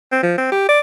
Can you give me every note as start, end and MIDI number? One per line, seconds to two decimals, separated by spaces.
0.12 0.22 60
0.23 0.36 53
0.38 0.51 60
0.52 0.66 67
0.69 0.80 74